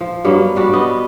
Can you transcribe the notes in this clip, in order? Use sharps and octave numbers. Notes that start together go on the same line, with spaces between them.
F3
G2 F#3 A#3 B3
G3 B3 D4 F#4
B3 D#5